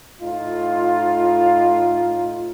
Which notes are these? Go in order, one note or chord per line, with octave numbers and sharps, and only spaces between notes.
A2 D#4 F4